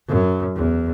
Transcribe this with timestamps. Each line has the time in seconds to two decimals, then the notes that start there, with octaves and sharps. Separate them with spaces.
0.08 F#2
0.56 E2